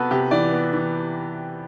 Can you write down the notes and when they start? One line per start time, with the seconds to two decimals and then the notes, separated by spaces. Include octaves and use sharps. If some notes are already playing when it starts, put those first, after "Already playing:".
Already playing: C3 B3 F#4 A4 B4
0.11 C3 G4
0.31 E3 D5
0.52 B3
0.73 E3